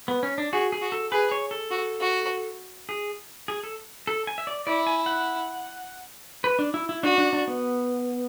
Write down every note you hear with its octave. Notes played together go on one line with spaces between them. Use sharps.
B3
C#4
D4
F#4 G#4
G#4
F#4
A4
G#4 B4
C#5
A4
F#4
F#4
G#4
G#4
A4
A4
G#5
E5
D5
E4 D5
G#5
F#5
B4
D4
E4
E4
D4 F#4
D4
D4
B3